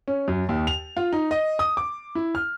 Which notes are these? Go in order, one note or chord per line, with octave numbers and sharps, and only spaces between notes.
C#4
F#2
D#2
F7
F4
D#4
D#5
D#6
D6
E4
F6